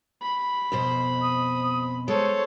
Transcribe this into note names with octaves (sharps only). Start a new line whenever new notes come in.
B5
F2 B2 C5
D#6
G#3 A4 C5 C#5